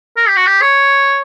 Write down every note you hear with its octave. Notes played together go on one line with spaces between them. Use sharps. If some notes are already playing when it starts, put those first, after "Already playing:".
A#4
G4
F#4
G4
C#5